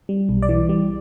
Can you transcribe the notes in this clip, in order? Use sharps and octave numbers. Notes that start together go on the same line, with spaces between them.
G3
B1
D5
E3
G3